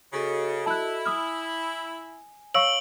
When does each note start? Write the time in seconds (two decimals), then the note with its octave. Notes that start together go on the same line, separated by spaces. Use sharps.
0.13 C#3 F#4 A4 D#5
0.66 E4 A5 F#6
1.06 G#5 D#6 F6
2.54 C#5 F5 C#6 E6 D7 F#7